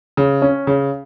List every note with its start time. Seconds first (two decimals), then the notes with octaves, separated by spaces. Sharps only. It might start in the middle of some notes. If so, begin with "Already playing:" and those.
0.17 C#3
0.42 C#4
0.67 C#3